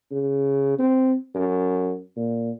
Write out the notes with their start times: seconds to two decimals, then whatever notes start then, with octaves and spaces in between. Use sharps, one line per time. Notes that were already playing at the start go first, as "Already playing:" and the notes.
0.11 C#3
0.79 C4
1.35 F#2
2.16 A#2